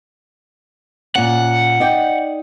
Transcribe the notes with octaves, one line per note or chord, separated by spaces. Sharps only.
A#2 C#4 F#5
D#4 D5 G5